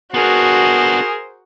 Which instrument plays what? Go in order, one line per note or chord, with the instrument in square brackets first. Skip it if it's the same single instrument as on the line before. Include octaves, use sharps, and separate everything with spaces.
[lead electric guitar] B3 D4 [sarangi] F#4 [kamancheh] G#4 A#4 [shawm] C5